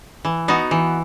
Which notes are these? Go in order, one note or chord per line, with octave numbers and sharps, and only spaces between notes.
E3
B3 D#4 F#4
E3